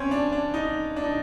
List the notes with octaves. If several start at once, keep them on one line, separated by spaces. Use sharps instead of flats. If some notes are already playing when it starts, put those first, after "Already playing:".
Already playing: C4 C#4
D4
D4
D#4
D4
D#4